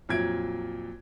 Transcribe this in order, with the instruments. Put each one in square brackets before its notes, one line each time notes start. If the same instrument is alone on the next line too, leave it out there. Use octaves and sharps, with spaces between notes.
[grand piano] F2 A#2 F#3 G#6 D7